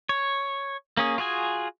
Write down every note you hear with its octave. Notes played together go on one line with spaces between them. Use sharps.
C#5
A#3 C#4 G#4
F4 F#4 G#4 G#5